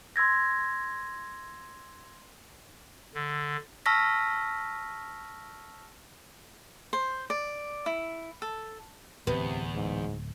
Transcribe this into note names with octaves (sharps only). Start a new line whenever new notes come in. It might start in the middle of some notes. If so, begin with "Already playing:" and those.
C6 E6 G#6 A#6
D3
A5 C#6 E6 F6 A#6 B6
C5
D5
E4
A4
D1 E2 C3 B3
G#2